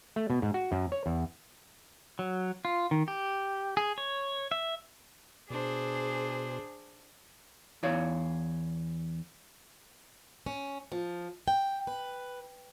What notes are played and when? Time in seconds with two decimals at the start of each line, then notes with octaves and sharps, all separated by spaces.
0.16 A3
0.30 B2
0.42 G#2
0.54 F#4
0.72 F#2
0.92 C#5
1.06 E2
2.19 F#3
2.65 F4
2.91 D#3
3.08 G4
3.77 G#4
3.98 C#5
4.51 E5
5.50 B2 D4 G#4 C5
7.83 E2 E4 C#5 F5
10.46 C#4
10.92 F3
11.48 G5
11.87 B4